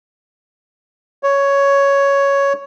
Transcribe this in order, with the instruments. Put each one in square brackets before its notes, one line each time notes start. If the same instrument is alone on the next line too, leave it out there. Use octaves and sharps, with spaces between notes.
[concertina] C#5